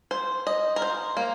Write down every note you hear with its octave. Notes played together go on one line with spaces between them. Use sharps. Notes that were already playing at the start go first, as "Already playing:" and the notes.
C5
D#5
A#4
C5
A#3